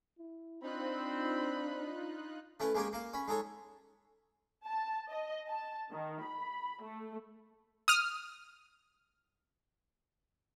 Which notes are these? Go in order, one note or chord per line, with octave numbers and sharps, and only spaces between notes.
E4
C4 D4 D#4 F4 B5 F#6
A3 C#4 E4 B4
G#3 A#3 C#4 G4 G#5
A#3 F5
C#4 B5
G#3 D#4 A4 C#5
A5
D#5
A5
D#3
B5
A3
D#6 F6